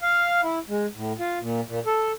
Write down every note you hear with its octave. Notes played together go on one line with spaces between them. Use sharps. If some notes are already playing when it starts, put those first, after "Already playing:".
F5
E4
G#3
A2
F4
A#2
A#2
A4